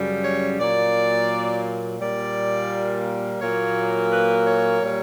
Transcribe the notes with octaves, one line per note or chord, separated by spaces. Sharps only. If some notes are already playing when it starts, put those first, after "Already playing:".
Already playing: F#2 C#3 G3
C#5
A#2 F#3 A#3 D5
A#2 G3 A#3 D5
A#2 F#3 A#3 C#5
B4
C#5
A#2 G3 A#3